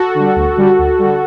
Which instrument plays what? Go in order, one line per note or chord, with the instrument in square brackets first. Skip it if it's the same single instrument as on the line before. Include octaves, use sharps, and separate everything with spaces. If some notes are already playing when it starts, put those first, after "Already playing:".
Already playing: [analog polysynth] F#4 A4
D3 G3
D2
D3 G3
D2
D3 G3